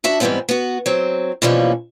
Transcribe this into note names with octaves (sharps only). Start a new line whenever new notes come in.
D4 F#4 E5 A5
G#2 E3 F#3 G3 B3 C4
B3 F#4
F#3 C4
B2 E3 F3 G3 A#3 C#4